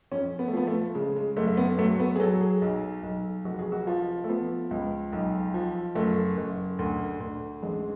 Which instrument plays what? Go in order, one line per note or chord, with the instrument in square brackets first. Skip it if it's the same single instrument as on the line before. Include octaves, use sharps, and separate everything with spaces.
[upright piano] F2 C#4
B3
A3
F3 B3
A3
C#3 G#3
G#3
F#1 A3
A3
B3
F#3 A3
B3
G#4
F#3 A4
G#4
B1
B1
F1 F#4
G#4
F#4
F3 F4
A3
F3 B3
C#2
B1
F3
F#1 A3
F#1
D2
D2
A1 G#3